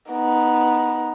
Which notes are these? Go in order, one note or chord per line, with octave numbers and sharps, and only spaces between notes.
B3 D#4